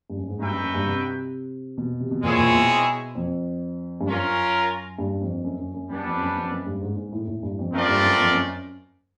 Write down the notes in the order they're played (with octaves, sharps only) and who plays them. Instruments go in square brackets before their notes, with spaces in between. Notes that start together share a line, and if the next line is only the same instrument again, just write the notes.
[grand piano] G2
F#2
G#2
[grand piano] G2 [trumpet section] D#4 F#4 B4 E5 G5
[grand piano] F#2
F#2
G2
C3
B2
C3
B2
[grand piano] A#2 [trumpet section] G#3 C4 E4 G#4 C#5
[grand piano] A#2
B2
F2
G2
[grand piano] F#2 [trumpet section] C#4 F4 A#4
[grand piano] G2
F2
F#2
F#2
F#2
[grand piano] F#2 [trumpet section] G3 B3 D4
[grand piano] F2
F#2
F2
F#2
G2
G#2
G#2
A2
A2
G2
F2
[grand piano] F#2 [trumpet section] A3 C4 F4 A#4 D5
[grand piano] G2
F#2
F2
F#2